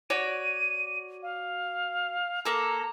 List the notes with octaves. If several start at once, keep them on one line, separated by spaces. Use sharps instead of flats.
F#4 C#5 D5 D#7
F5
A#3 A4 A#5